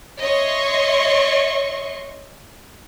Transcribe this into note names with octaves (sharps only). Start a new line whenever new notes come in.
C#5 D#5 E5 C6 C#6